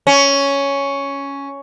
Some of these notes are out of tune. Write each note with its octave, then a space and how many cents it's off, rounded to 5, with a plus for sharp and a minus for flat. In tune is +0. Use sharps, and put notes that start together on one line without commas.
C#4 +5